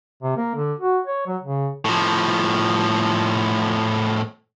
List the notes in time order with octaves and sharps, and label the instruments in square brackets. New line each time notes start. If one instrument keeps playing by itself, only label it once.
[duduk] C3
A#3
D3
F#4
C#5
F#3
C#3
[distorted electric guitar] A2 F3